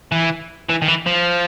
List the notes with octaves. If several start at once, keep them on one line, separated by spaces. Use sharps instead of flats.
E3
E3
D#3
E3
F3